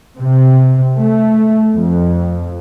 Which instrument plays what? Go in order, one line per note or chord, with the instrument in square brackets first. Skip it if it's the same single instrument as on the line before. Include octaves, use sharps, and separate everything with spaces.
[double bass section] C3
A3
F2